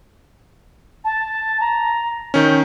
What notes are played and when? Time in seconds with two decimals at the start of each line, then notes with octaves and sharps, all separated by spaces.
1.04 A5
1.60 A#5
2.34 D#3 C#4 G6